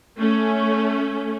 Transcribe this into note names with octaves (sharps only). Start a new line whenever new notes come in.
A3 C#4